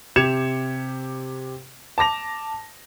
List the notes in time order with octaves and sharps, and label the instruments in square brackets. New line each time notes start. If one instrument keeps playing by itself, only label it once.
[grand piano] C3 G4 G#6 C#7 E7 F7
A5 D6 A#6 F7